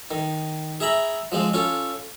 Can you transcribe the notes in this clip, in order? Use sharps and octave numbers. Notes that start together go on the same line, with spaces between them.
D#3
G#4 E5 A#5 B5
F3 G#3 C4
C#4 F4 A4